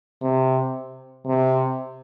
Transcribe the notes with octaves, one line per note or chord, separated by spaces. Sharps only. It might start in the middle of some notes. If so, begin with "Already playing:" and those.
C3
C3